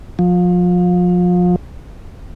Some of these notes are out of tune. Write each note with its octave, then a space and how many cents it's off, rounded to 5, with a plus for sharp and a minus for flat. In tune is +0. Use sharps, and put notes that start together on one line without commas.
F3 +30